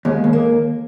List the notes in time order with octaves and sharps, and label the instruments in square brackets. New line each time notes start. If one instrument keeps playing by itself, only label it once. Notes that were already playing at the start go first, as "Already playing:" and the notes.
[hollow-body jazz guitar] D#2 [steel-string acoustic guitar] G#3
[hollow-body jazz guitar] D#2
[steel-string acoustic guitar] A#3